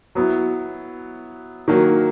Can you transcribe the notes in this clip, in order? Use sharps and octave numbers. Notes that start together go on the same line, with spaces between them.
F#3 B3 E4
D#3 F#3 A#3